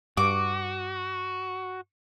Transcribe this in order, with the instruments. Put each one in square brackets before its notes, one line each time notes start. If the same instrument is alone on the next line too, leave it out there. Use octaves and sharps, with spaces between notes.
[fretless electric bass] G2 [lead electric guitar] F#4 [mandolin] D6